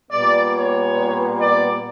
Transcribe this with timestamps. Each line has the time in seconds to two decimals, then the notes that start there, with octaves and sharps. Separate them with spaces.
0.11 A#2 G3 B3 D5
0.54 C#5
1.37 D5